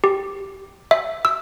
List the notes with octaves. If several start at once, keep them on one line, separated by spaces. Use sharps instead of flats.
G4
E5
E6